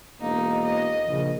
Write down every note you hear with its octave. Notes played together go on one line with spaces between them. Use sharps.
E1 A#3 D#4
D#5
A#1 C#3